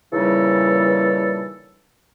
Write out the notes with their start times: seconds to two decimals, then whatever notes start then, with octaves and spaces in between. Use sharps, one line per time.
0.13 A#2 C#3 E3 G3 D#4 A4